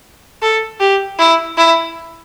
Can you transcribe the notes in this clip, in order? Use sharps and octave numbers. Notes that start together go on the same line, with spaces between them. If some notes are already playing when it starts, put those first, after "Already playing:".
A4
G4
E4
E4